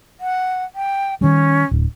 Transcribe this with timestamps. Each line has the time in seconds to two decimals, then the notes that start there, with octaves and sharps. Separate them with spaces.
0.20 F#5
0.75 G5
1.21 D#3 G3 C#4
1.71 D1